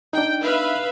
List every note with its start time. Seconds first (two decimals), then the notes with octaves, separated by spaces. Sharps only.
0.13 D4 D#4 G5
0.42 B4 E5 F5